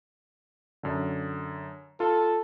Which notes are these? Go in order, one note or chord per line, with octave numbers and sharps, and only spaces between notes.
F#2 D3
F4 A4